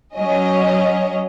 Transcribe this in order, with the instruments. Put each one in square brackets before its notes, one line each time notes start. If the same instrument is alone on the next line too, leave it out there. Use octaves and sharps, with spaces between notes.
[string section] F#3 C#4 D#5